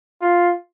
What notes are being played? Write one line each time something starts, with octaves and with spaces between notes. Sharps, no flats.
F4